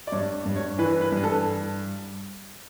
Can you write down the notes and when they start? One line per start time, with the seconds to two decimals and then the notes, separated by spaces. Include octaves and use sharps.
0.07 D5
0.12 G2 C#5
0.46 G2
0.56 C#5
0.78 E3 B4
1.01 B4
1.12 G2
1.17 B4
1.23 A4